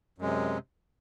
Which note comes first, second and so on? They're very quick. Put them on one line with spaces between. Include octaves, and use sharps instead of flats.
F#2 G#3 C3